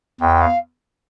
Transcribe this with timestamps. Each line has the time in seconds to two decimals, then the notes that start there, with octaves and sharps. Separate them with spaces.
0.20 E2 G5
0.41 F5